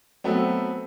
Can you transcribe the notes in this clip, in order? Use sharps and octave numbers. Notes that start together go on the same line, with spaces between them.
F#3 A3 B3 C4